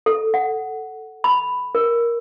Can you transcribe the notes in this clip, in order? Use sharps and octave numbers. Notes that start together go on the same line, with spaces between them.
A4
F#5
B5
A#4